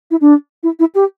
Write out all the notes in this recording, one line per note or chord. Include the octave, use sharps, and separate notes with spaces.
E4
D4
E4
E4
G4